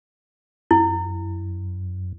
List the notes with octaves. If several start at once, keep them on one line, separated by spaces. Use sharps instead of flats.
F#2 E4